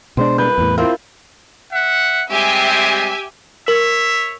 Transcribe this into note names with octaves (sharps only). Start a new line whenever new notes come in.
B2 G#3 D4 C5
C2 B4 G6
E2 A2
C4 E4 F4 A#4
E5 F#5
G3 G#3 C4 G4 E5 G#5
A#4 C#5 E5